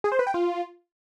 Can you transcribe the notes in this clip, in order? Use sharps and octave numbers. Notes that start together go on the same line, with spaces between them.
G#4
C5
B4
G5
F4